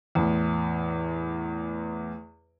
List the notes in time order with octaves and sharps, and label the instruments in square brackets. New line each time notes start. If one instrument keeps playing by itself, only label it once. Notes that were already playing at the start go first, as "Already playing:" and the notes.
[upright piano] E2 A2